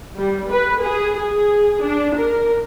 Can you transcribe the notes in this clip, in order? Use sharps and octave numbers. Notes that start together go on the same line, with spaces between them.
G3
B4
G#4
G#4
D4
A#4